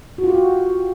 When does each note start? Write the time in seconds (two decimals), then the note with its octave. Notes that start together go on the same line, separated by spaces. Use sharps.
0.18 F#4
0.24 F4
0.29 G4
0.34 F#4